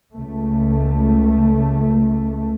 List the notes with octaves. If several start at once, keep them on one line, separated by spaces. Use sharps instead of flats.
C#2 A3